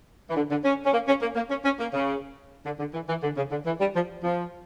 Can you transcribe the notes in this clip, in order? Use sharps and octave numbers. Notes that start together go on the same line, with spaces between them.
E3
D3
D3
C#4
C#4
A#3
C#4
A#3
A#3
C#4
C#4
A#3
C#3
D3
D3
E3
E3
D3
C#3
D3
E3
G3
F3
F3